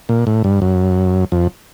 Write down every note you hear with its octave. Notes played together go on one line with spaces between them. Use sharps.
A#2
A2
G2
F#2
F2